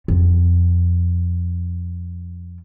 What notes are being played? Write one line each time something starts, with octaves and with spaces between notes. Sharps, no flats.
F2